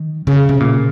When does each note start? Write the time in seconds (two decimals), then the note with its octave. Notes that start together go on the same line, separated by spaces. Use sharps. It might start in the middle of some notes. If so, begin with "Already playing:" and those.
Already playing: D#3
0.27 C#3
0.49 C3
0.60 A#2